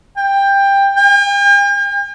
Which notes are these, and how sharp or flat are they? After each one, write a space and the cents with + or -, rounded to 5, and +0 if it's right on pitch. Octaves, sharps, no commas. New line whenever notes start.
G5 +15
G5 +45